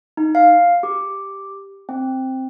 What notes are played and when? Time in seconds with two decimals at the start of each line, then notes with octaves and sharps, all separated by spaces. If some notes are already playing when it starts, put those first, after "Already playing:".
0.17 D#4
0.35 F5
0.83 G4
1.89 C4